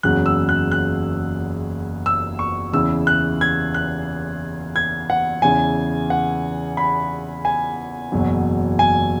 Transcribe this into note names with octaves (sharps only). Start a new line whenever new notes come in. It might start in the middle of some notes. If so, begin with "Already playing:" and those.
F#1 E2 C#3 F#3 F#6
E6
F#6
F#6
E6
C#6
E2 C#3 E3 E6
F#6
G#6
F#6
G#6
F#5
E2 C#3 E3 G#5
F#5
B5
G#5
F#1 E2 B2 F#3
G#5